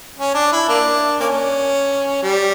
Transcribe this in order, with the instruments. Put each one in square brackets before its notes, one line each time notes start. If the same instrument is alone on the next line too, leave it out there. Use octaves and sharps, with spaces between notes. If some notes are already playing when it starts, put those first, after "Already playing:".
[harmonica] C#4
D4
E4
A#3 D4
A#3 C#4
G3